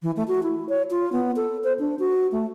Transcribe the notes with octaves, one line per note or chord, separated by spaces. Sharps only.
E3
A3
F#4
E4
C#5
F4
B3
A4
C5
D4
F#4
A3